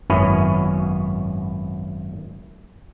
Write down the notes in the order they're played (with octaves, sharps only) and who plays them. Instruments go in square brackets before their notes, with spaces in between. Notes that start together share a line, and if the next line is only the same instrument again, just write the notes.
[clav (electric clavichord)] G#1 F#2 B3 C#4 E4